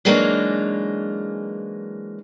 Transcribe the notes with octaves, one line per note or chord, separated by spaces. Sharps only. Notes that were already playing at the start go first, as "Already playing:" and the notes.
E3 F#3 G#3 A#3 D4 D#4